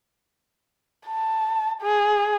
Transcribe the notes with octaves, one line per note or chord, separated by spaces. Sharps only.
A5
G#4